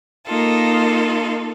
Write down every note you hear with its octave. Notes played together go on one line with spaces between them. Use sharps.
A#3 D#4 F4 A4